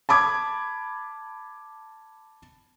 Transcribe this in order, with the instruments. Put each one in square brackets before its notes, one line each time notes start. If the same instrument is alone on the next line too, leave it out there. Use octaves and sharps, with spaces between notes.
[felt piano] A5 B5 D6 G#6